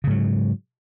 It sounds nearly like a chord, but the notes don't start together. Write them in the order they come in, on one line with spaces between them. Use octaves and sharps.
C#3 G#2 F#3